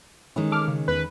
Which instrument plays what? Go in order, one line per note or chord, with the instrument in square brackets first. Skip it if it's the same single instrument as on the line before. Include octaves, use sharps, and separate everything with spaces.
[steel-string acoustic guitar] D#3 G#3 C#4 [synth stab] E3
[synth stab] A4 D6 F6
C#3
[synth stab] E2 [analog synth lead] B4